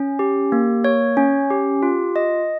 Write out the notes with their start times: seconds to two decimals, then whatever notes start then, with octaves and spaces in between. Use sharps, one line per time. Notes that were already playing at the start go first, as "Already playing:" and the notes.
Already playing: C#4
0.19 G4
0.52 A#3
0.84 C#5
1.17 C#4
1.50 G4
1.83 F4
2.16 D#5